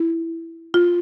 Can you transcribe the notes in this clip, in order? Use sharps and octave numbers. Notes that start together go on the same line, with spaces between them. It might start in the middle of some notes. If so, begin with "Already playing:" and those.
Already playing: E4
F4